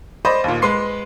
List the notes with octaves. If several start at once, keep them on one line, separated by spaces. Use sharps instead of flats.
C5 D5 D#5 B5 C6
D#2 A#2
G#3 B4 C6 C7